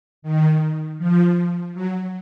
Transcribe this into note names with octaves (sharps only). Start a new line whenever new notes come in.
D#3
F3
F#3